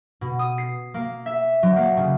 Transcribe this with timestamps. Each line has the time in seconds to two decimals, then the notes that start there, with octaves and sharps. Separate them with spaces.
0.21 B2
0.39 D#6
0.58 C7
0.94 A#3
1.26 E5
1.63 F#3
1.76 A#3
1.97 C#3